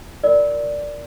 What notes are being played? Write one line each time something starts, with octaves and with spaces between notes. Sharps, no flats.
F4 A#4 D5